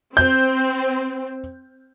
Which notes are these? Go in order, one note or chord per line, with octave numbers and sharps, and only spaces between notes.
C4 G6